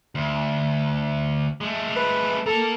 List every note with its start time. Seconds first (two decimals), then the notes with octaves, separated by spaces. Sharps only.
0.15 D2
1.61 G#3 A3
1.96 B4
2.46 A#3 A4 A#5